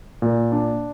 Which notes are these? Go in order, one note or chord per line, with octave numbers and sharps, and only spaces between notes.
A#2
D4